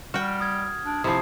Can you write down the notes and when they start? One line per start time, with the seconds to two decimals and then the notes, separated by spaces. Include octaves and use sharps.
0.14 G3 F#4 G5 F6
0.40 D#6 G#6
0.86 D4
1.04 C3 F3 E4 D#6 C7